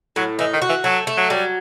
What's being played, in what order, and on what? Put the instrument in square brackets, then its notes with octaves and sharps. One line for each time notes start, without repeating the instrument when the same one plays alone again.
[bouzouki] A2 [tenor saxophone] F#3
[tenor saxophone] E3 [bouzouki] D#4
[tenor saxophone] D#3
[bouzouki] F#4
[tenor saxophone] E3
[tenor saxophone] F#3 [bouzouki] A3
[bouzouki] A3
[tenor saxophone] F#3
[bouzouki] F#3 [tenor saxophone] G3